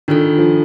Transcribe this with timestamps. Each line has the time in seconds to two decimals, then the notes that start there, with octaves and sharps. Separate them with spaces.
0.08 D#3 D4 F4 A4
0.38 F3